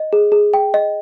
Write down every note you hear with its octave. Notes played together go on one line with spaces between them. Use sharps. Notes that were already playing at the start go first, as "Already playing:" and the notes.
Already playing: D#5
G#4
G#4
G5
D#5